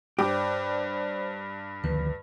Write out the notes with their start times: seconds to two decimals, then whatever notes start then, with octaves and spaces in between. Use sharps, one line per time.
0.19 G2 G4 C5 D5
1.84 D2 D#3 F3 B4